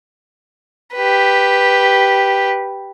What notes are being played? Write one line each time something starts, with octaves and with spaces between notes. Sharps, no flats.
G4 B4